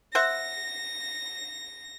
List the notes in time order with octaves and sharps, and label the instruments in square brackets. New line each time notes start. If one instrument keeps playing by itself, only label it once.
[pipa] C5 E5 F#5 [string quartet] A#6